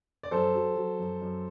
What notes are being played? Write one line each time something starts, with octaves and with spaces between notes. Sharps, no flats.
D5
F#2 A4 C5
F#3
F#3
F#2
F#2